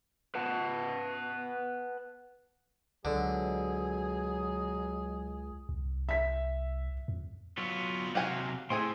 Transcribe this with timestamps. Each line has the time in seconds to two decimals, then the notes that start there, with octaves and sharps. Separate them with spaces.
0.35 B4 F#5 A5
3.05 C#2 B2 D3 F#3 G#4
5.69 C2
6.09 E5 B6
7.08 F2
7.58 F#3 B3 F4
8.15 C3 F#3 G4 F5 F#5 G#5
8.70 A2 C4 G#4 E5 G#5 C6